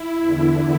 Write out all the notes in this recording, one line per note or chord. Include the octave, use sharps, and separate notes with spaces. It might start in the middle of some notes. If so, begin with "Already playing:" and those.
Already playing: E4
E2 D3